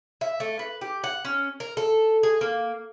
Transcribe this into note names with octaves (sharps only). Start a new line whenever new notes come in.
E5
A3
B4
G4
F#5
C#4
A#4
A4
G#4
A#3